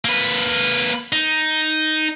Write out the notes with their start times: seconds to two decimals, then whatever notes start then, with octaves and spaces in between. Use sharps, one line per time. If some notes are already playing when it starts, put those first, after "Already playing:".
0.05 A#3 B4
1.13 D#4